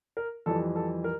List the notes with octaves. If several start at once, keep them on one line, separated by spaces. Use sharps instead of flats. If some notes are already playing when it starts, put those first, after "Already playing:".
A#4
F2 E3 G3 A4
A4
A#4